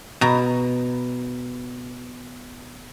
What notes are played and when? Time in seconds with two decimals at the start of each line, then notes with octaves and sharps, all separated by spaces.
0.21 B2 A#5